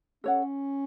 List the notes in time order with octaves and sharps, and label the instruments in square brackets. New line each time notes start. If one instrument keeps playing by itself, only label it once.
[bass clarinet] C#4 [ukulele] A4 C#5 F#5